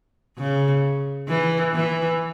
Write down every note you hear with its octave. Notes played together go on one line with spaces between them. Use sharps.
C#3
E3
E3